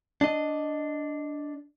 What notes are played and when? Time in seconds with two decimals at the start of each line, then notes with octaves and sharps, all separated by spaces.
0.21 D4 D#5